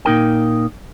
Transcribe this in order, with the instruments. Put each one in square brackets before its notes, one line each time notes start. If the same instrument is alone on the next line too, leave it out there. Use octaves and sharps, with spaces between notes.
[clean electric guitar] A#2 D#4 A#4 G5